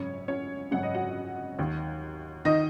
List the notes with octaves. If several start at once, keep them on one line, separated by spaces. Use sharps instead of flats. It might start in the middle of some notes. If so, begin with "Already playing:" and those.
Already playing: G#1 F#2 C#3 C#4 C#5
C#4 C#5
G#1 F#2 C#3 F#5
D#5
F#4 F#5
D#2 D#3
D#3 D#4 D#5